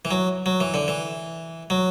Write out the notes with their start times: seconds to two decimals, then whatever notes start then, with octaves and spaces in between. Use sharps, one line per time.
0.05 E3
0.11 F#3
0.46 F#3
0.60 E3
0.74 D3
0.88 E3
1.70 F#3